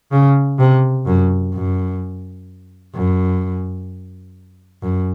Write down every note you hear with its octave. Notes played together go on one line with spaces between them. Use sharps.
C#3
C3
F#2
F#2
F#2
F#2